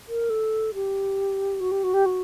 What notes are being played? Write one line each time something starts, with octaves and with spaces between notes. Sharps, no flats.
A#4
A4
G4
F#4
G4
F#4
G4
F#4